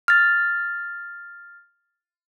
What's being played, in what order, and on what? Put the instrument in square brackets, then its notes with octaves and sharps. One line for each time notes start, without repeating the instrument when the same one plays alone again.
[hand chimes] F6 A6